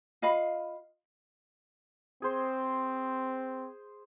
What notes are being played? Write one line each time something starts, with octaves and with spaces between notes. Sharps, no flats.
F4 D#5 F5 B5
C4 G#4 C5